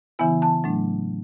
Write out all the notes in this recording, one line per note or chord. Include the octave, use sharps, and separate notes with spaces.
C#3 E3 B3 E4 G#5
A5
A2 F#3 A3 D4